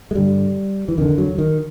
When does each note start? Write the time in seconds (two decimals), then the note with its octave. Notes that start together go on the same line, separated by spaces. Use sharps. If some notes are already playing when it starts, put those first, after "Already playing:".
0.11 G#3
0.15 G2 D3 G3
0.88 E3
0.98 F2 D3 D#3
1.18 F#3
1.38 D#3